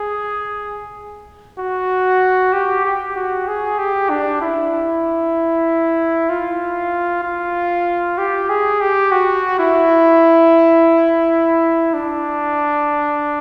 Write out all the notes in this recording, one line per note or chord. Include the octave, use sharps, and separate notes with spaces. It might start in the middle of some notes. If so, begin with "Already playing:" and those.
Already playing: G#4
F#4
G4
G4
F#4
G#4
G4
D4
E4
F4
F4
G4
G#4
G4
F#4
E4
D4